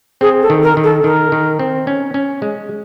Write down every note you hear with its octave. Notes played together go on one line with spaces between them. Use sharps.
C4 G#4
A4
D#3
A#4
D#3
A4
D#3 A#4
D#3
C4
C#4
C#4
G#3